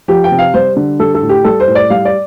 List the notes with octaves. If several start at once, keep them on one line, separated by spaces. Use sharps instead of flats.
F3 G4
G5
C3
F5
G3 C5
D3
G3 A4
A4
A2
G4
G3 A4
C5
A2
D5
G3 F5
D5